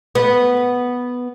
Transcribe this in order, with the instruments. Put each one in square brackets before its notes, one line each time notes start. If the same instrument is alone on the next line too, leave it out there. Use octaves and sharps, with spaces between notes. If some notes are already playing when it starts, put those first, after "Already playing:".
[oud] B3